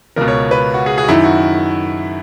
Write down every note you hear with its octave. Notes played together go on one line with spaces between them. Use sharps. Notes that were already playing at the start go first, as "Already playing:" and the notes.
C#2 B2 A#4
C#5
B4
F#4
G#4
G#4
F#4
F#2 D#3 E4
F#4